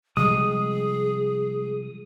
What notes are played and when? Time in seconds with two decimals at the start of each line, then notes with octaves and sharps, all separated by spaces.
0.17 C3 F3 G3 G#3 G#4 D#6